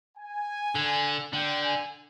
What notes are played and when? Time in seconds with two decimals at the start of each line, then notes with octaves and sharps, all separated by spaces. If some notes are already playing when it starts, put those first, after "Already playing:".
0.18 G#5
0.75 D3
1.33 D3 G5
1.63 G#5